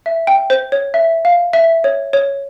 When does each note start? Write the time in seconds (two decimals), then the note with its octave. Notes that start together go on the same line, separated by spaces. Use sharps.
0.06 E5
0.27 G5
0.50 C5
0.72 C#5
0.94 E5
1.25 F5
1.53 E5
1.84 C#5
2.13 C#5